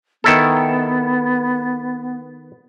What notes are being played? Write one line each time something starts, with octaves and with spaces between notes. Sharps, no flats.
D#3 B3 E4 A4